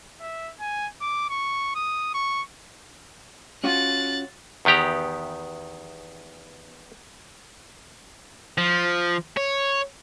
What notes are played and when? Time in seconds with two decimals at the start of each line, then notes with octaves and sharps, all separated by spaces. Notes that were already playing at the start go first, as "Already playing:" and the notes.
0.21 E5
0.60 G#5
1.01 D6
1.30 C#6
1.75 D#6
2.14 C#6
3.64 C#4 F4 F#4 F#6 A6
4.65 E2 D#3 B3 G4 A#5
8.58 F3
9.37 C#5